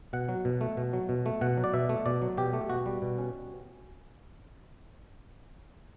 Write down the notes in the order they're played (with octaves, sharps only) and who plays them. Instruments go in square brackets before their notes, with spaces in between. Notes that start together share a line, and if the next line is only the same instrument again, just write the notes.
[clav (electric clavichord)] B2 F#5
F#3
B2
A3
B2
F#3
B2
A3
B2 F#5
F#3
D5
B2 E5
A3
B2 D5
F#3
B2 G4
A3
B2 F#4
G3
B2
C#4